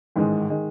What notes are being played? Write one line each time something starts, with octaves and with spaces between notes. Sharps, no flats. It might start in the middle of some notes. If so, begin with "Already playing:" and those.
A1 G#2 D#3 G#3
D#3 G#3